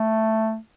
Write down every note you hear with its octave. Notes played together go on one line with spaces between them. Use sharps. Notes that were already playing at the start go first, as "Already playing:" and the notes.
Already playing: A3